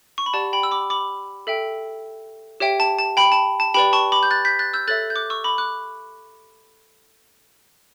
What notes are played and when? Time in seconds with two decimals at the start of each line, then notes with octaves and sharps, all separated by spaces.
0.18 C#6
0.26 B5
0.33 G4 D5 F#5 A5
0.53 G5 B5
0.63 E6
0.71 B5 D6
0.90 B5 D6
1.47 A4 E5 G5
2.60 G4 C#5 E5 G5
2.80 A5
2.99 A5
3.17 G5 B5
3.32 A5
3.60 A5
3.74 G4 B4 D5 G5 B5
3.93 A5 C#6
4.12 B5 D6
4.23 G6
4.31 F#6 A6
4.45 G6 B6
4.59 F#6 A6
4.74 E6 G6
4.88 A4 C#5 E5 F#6 A6
5.10 G6
5.16 D6 F#6
5.30 C#6 E6
5.44 B5 D6
5.58 D6 F#6